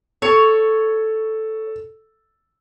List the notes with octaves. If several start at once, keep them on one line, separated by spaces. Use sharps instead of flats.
A4 C#5